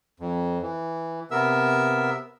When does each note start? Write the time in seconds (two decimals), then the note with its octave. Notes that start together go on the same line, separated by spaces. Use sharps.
0.20 F2
0.62 E3
1.31 C3 B3 A#4 E5 E6